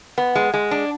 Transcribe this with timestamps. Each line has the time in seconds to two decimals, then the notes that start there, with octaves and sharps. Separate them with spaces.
0.18 B3
0.35 G#3
0.54 G#3
0.71 D4